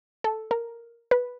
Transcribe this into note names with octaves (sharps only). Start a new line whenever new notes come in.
A4
A#4
B4